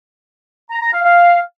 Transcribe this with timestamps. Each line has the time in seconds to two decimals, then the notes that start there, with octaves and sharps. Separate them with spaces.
0.71 A#5
0.82 A#5
0.93 F5
1.05 F5